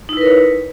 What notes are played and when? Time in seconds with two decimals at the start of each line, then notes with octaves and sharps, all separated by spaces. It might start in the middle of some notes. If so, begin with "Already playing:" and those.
0.09 D#4
0.13 E4
0.17 B4
0.21 A#4
0.25 C#5